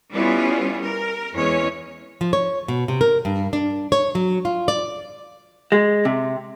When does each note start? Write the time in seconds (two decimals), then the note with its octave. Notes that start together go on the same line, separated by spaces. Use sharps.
0.12 G3 B3 C#4 E4 F4
0.81 A#4
1.33 E2 E3 G#3 C#4 C#5
2.21 F3
2.33 C#5
2.68 B2
2.88 C3
3.01 A#4
3.25 G2
3.53 D4
3.92 C#5
4.15 F#3
4.45 F4
4.68 D5
5.72 G#3
6.05 C3